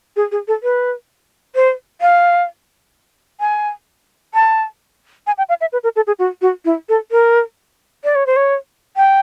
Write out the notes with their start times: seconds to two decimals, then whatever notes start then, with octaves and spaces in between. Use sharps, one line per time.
0.16 G#4
0.32 G#4
0.48 A4
0.63 B4
1.55 C5
2.01 F5
3.40 G#5
4.34 A5
5.27 G#5
5.38 G5
5.49 F5
5.61 E5
5.73 B4
5.83 A#4
5.96 A4
6.07 G#4
6.19 F#4
6.41 F#4
6.65 E4
6.89 A4
7.11 A#4
8.04 D5
8.15 C#5
8.26 C5
8.36 C#5
8.97 G5